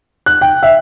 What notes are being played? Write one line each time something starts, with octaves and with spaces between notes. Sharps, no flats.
F#6
G5
E5